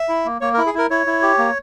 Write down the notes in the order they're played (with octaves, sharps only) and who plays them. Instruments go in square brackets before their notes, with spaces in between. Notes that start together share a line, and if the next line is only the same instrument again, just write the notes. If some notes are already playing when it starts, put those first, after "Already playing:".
Already playing: [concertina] E5
E4
A#3
A#3 C#5
A#4
E4
G#4
E4 A#4
E4 C#5
E4
G4
A#3